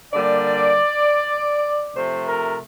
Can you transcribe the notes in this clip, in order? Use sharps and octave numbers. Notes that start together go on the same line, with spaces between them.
D3 G3 A#3 D5
C3 F3 A3 C5
A#4